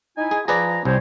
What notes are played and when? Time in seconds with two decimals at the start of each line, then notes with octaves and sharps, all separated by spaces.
0.18 D#4 E4 G#5
0.31 G#4
0.48 F3 G#4 B4 D5 A#5
0.85 C2 G3 C5 C#5